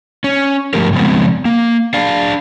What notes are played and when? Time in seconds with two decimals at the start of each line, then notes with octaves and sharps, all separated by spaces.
0.24 C#4
0.74 G2 F3 A3 G4 A#4
0.93 C#3 F3 G#3 B3 C4
1.45 A#3
1.94 D4 F5